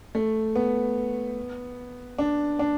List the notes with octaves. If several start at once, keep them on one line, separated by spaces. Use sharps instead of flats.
A3
B3
D4
D4